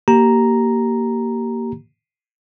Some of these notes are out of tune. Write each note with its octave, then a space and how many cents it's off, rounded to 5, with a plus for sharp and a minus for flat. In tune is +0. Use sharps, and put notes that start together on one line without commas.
A#3 +0 G4 -20 A#5 +0